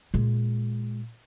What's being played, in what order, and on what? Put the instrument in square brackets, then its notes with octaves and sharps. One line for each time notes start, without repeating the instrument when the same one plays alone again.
[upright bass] A#2 G#3